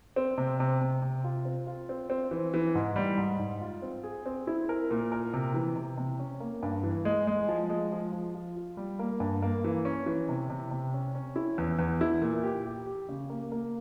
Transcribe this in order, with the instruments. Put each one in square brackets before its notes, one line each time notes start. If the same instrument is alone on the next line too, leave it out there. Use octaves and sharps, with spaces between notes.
[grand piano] C4
C3
C3
C3
C3
F4
C4
F4
C4
C4
E3
E3
G#2
G3
G#2
G#2
F4
C4
G#4
C4
E4
A#4
A#2
A#4
C3
E3
C3
C3
C#4
A#3
G2
E3
G#3
G#3
F3
G#3
F3
F3
F4
F4
G3
A#3
G2
A#3
E3
C#4
E3
C3
C3
C3
C#4
C#4
E4
E2
E2
E4
A#2
G4
G4
G4
C#3
A#3
A#3